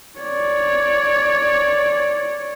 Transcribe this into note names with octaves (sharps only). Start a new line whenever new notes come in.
C#5 D5